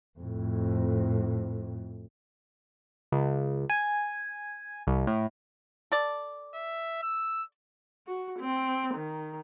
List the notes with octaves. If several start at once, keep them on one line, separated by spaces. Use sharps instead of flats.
F2 A2
C#2
G#5
C2
A2
A4 D5
E5
E6
F#4
C4
D#3